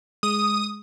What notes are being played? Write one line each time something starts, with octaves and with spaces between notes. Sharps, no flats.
G#3 D#6